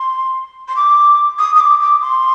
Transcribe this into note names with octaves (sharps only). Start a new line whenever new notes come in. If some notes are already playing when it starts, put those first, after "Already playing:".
Already playing: C6
C6
D6
D#6
D#6
D6
D6
C6